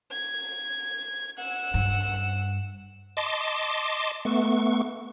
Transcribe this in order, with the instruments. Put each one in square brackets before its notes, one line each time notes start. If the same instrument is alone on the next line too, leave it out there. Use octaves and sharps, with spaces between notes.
[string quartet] G#6
F#5 E6
[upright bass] G2
[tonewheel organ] D#5 A5 C6 D6
A3 B3 C#6